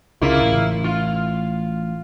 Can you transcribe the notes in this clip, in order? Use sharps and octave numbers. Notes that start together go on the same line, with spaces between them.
C#2 C#3 A#3 E4 F4
A1 A2
F4